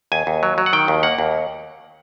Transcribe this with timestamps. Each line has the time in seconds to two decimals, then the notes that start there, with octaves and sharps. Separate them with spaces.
0.12 D#2 G#5
0.27 D#2
0.43 F#3
0.58 F#3
0.66 F#5
0.73 D#3 G5
0.88 D#2
1.03 A#3 F#5
1.18 D#2